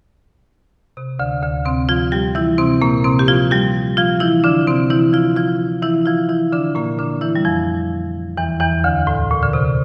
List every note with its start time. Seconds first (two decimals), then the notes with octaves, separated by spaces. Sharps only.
0.97 C3
1.19 D2 D3
1.42 D2 D3
1.65 C3 C4
1.89 F3 F4
2.12 G3 G4
2.35 E3 E4
2.58 C3 C4
2.82 A#2 A#3
3.04 C3 C4
3.19 G4
3.28 F3 F4
3.51 G3 G4
3.97 F3 F4
4.20 E3 E4
4.44 D3 D4
4.67 C3 C4
4.90 E3 E4
5.13 F3 F4
5.36 F3 F4
5.83 E3 E4
6.06 F3 F4
6.29 E3 E4
6.52 D3 D4
6.75 A#2 A#3
6.99 D3 D4
7.21 E3 E4
7.35 G3
7.45 F2 F3
8.37 E2 E3
8.60 E2 E3
8.84 D2 D3
9.07 A2
9.31 A#2
9.42 D3
9.53 C3